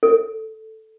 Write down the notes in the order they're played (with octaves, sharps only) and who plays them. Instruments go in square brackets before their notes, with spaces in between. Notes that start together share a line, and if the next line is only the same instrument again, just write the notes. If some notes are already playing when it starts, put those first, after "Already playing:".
[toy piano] A4